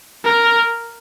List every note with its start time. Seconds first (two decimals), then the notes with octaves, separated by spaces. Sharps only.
0.25 A#4